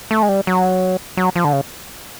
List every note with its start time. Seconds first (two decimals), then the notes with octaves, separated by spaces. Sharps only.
0.11 A3
0.23 G#3
0.29 G3
0.47 F#3
1.17 F#3
1.36 F3
1.44 D3
1.53 C#3